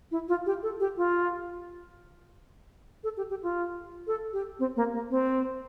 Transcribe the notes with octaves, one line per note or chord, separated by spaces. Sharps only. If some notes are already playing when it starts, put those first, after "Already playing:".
E4
F4
G4
A4
G4
F4
A4
G4
G4
F4
A4
G4
C4
A#3
A#3
C4